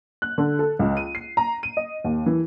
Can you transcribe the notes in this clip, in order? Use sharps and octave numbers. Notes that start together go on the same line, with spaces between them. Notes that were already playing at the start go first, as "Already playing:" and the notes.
F#6
D3
A4
C#2
D#7
C7
A#5
D#7
D#5
D#2
E3